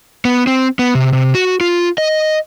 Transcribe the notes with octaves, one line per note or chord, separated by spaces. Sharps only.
B3
C4
B3
C3
C3
F#4
F4
D#5